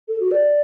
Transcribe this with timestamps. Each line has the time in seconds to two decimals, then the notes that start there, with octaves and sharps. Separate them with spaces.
0.08 A4
0.20 F#4
0.31 D5